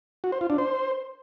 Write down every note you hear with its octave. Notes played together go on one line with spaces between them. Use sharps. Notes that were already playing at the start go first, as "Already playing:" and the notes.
F#4
C5
F4
D4
C5